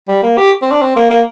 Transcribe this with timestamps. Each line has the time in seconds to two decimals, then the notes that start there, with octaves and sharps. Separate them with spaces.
0.08 G3
0.23 A#3
0.37 G4
0.62 C4
0.71 D4
0.82 C4
0.96 A#3
1.10 A#3